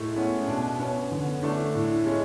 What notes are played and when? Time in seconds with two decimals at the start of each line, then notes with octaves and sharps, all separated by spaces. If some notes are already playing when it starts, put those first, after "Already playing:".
Already playing: A2 G#3 A3
0.16 B3 C#4
0.47 B2 D4
0.79 B3 C#4
1.12 D3
1.43 A3 D4
1.75 A2
2.06 G#3 C#4